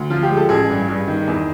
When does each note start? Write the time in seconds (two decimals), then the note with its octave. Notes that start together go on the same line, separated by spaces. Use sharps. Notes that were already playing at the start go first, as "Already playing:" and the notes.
Already playing: D2
0.10 F3 F4
0.23 G4
0.30 G#3
0.37 A4
0.49 A1 G#4
0.69 G2
0.88 G2
1.08 D#3
1.27 E2